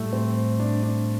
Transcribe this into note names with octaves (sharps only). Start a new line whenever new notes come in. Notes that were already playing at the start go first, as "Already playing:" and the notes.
Already playing: A2 G3 A3 E4 A4
C4
D4
D4